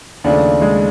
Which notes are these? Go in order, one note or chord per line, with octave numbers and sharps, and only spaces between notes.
D#2 C#3 F3 A3 D4
G#3